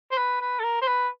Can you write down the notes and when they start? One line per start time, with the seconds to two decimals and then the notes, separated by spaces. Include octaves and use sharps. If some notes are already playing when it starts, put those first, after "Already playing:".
0.11 C5
0.17 B4
0.41 B4
0.59 A4
0.64 A#4
0.82 C5
0.87 B4